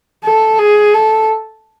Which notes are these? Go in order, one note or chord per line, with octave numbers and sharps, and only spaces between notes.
A4
G#4
A4